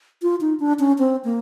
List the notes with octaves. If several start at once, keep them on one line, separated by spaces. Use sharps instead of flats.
F4
D#4
D4
C#4
C4
A#3